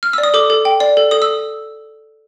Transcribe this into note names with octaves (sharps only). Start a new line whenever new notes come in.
F6
D5 E6
D#6
A4 D6
A4
G5
D5
A4
A4 D#6
E6